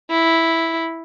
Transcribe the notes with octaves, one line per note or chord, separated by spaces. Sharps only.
E4